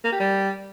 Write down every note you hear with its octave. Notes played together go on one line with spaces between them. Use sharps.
A#3
G4
G3